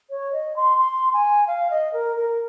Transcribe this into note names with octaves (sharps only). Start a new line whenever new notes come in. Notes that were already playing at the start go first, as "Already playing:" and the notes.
C#5
D#5
C6
C6
G#5
F5
D#5
A#4
A#4